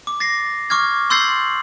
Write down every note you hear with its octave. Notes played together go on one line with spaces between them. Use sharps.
D6
A6 A#6 C7
C#6 D6 F6 G#6
C6 E6 G6 A6 C7 F#7